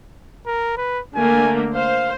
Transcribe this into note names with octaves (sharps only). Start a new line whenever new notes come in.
A#4
B4
D3 A3 A#3 G#5
C5 F5